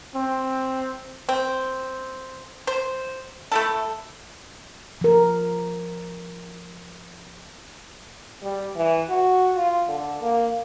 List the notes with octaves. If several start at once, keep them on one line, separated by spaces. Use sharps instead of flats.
C4
C4
C5
A3 E4 A4
F3 A#4
G3
E3
F#4
F4
D3
A#3